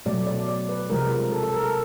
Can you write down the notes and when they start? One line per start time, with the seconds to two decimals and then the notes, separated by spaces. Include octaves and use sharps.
0.06 B2 F#3 A3 D5
0.27 D5
0.48 D5
0.69 B4
0.90 C3 F3 G#3 A#4
1.32 A4
1.43 A4
1.54 A#4
1.64 A4